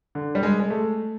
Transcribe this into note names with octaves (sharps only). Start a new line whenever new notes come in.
D3
G3
G#3
G#3
A3